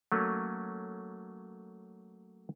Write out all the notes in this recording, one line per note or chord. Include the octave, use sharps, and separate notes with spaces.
F#3 A3 A#3 C#4